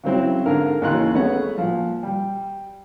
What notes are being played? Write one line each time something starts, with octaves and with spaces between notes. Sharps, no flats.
C#3 F#3 C4 E4
G#2 D3 A#4 F5 G#5
D#2 C#3 E3 A#5 C6 F#6
A3 B3 G#4 C#5 F#5
A#2 F3
G3